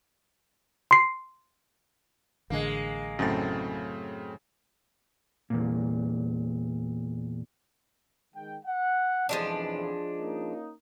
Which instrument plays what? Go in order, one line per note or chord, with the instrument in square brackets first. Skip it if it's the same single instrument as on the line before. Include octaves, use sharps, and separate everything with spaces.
[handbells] C6 C7
[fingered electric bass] A1 D3 [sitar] G#3 A#3
[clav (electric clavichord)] F#2 A2 [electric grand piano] C#3 C4 A6
[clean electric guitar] E2 A#2
[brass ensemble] D#3 G#3 G5
F#5
[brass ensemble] B1 F2 E3 [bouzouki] F3 G#3 D4
[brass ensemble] A#3 C#4 D#4